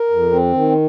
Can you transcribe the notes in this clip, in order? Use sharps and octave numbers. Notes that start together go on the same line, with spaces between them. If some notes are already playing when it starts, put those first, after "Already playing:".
Already playing: A#4
F2
C4
D#3